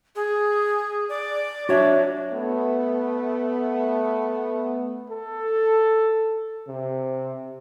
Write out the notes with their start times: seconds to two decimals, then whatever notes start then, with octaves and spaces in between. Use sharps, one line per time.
0.16 G#4
1.09 D5
1.69 D4 F#4 C#5 E5
2.32 A3 B3
5.10 A4
6.68 C3